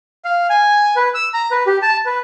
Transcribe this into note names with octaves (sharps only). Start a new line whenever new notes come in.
F5
G#5
B4
E6
A#5
B4
G4
A5
B4